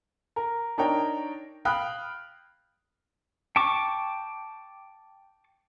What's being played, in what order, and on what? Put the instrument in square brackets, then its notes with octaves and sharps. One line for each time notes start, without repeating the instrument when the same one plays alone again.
[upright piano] A#4
D4 D#4 A#4 C#5 G5
F5 G5 B5 D#6 F6 F#6
[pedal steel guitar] G5 A5 C#6 D6